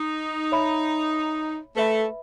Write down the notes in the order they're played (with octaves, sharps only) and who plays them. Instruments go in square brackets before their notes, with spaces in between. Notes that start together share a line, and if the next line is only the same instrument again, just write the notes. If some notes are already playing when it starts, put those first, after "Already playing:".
Already playing: [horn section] D#4
[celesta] C#5 E5 B5
[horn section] A3 [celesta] B4 E5 B5